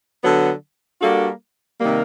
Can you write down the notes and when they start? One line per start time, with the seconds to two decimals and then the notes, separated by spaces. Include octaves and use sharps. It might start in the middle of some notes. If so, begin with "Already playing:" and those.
0.22 D3 F#3 B3
1.01 G3 A#3 D4 F#4 A4
1.80 C3 D#3 G3 A#3